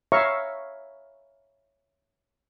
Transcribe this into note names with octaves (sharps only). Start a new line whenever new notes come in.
C#5 E5 F5 A#5 C#6